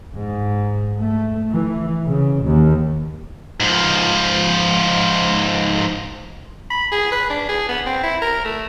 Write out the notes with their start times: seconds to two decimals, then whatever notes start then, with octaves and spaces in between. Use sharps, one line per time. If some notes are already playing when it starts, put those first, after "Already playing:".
0.15 G#2
0.99 A3
1.52 E3
2.05 C#3
2.43 D#2
3.60 G#2 F3
6.70 B5
6.92 G#4
7.12 B4
7.30 D4
7.49 G#4
7.68 B3
7.86 C4
8.03 E4
8.22 A#4
8.44 A3